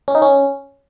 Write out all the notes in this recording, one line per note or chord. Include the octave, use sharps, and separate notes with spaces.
C#4
D#4
C#4